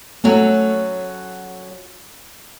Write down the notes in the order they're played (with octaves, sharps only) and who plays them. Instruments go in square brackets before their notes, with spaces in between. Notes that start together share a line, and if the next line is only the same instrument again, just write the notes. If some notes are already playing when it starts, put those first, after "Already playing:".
[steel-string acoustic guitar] F#3 C#4 F#4 A4 [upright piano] A3